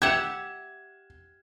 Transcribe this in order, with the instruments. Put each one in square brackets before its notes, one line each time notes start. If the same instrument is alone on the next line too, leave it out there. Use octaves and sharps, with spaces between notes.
[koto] G4 E5 F#5 [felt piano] G#6 E7